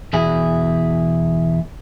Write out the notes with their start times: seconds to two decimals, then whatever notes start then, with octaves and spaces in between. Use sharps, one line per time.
0.13 E2 B2 E4 G#4